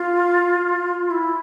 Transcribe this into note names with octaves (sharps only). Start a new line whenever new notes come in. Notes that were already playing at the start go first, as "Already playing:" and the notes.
Already playing: F4
E4